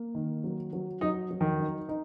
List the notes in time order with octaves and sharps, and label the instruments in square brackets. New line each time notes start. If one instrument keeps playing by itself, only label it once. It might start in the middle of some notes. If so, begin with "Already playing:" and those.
Already playing: [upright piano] A#3
D#3
F#3
F#3
[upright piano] F#3 [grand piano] D#4
[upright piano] F#3
[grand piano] D#3
[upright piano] D#4
D#4